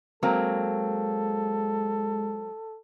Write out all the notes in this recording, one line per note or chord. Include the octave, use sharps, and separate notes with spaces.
F#3 G#3 A#3 C4 A4